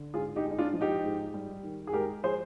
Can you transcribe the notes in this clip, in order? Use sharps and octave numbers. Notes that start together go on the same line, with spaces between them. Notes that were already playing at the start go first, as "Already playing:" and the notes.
Already playing: D3
G#2 F4 G#4
D#4 G4
G#3
D#4
D4 F4
F3
D#4 G4
G#2
G3
D#3
G#4
G#3 G4 A#4
F3 G#4 C5